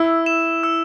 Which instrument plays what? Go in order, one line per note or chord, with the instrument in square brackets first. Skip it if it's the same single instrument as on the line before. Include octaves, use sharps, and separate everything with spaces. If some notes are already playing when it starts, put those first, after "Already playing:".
Already playing: [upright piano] E4 [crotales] E6
[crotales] E7
E6